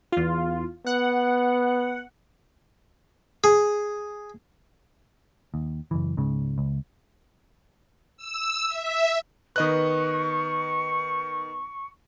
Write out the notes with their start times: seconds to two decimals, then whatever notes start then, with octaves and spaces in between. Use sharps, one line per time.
0.12 E2 F4
0.87 B3 F#5
3.44 G#4
5.54 D#2
5.91 F#1 E3
6.17 C#2 G#2 C#3
6.58 C#2
8.17 E6
8.68 E5
9.56 D#3 B3 B4 D#5 C#6 F#6